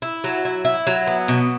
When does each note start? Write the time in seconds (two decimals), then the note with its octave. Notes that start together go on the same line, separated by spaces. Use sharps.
0.02 E4
0.24 F#3
0.45 E4
0.65 E4
0.87 F#3
1.07 B3
1.28 B2